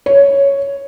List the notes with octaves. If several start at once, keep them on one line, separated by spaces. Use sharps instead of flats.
C#5